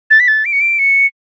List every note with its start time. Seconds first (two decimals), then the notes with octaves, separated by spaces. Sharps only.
0.11 A6
0.20 B6
0.28 A6
0.45 D7
0.53 C#7
0.61 D7
0.79 C#7